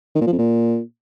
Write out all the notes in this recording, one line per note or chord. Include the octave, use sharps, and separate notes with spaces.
D#3
A#2
F3
F2
A#2